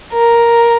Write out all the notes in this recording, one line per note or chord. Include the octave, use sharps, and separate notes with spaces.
A#4